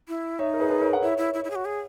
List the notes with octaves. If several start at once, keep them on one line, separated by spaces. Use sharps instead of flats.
E4
D#4 C#5 E5
A#4
G#4 B4
G#4 B4
A#4 C#5
F#5
E4 C#5 E5
E4
E4
E4
G#4
F#4
G#4